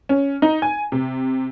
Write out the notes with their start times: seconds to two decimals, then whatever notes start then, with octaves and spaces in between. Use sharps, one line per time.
0.09 C#4
0.42 D#4
0.62 G#5
0.92 C3